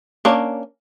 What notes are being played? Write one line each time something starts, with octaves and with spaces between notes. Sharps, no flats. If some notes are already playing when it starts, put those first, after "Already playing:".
A#3 C#4 D4